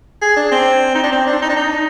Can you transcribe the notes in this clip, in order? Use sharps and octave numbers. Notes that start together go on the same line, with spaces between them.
G#4
D4
C4
D#4
D4
C4
D4
D#4
D4
D#4